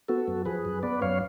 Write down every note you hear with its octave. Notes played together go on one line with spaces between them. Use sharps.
B3 F#4 A4
F#2
F3 G#4 B4
F#2
B3 B4 D5
F#2 C#5 F5